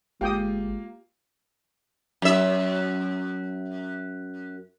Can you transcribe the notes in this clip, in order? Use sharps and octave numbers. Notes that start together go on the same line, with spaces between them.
G1 G#3 A#3 F4 G4 G5 D#6
F#2 E5